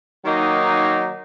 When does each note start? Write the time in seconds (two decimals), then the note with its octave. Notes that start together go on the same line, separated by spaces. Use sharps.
0.24 D#3 F#3 A#3 D#4